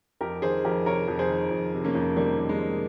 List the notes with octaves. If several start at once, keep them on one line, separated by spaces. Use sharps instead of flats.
F2 G4 A#4
D#3 G#4 C5
F2 G4 A#4
C3 A#4 C#5
F2
G#4 C5
D#3
F2
C3
A#3 C#4
F2
D#3 G3 A#3
F2
G#3
C3